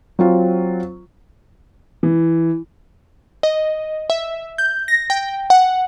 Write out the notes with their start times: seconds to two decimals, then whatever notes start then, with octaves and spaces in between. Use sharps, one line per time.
0.19 F#3 C4 F4
2.03 E3
3.43 D#5
4.10 E5
4.58 G6
4.88 A#6
5.10 G5
5.50 F#5